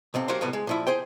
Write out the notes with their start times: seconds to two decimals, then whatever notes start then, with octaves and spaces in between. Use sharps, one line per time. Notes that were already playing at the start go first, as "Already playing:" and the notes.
0.14 B1 C3 C4 F5
0.28 F#3 A#3 F#4 G4 C5 F5
0.41 A2 C3 G3 B3
0.53 G#3
0.67 A#2 F3 E4
0.87 G#4 C5 G5